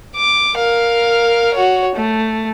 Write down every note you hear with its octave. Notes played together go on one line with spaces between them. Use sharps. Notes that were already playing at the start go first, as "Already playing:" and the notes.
D6
A#4 F5
F#4 C#5
A3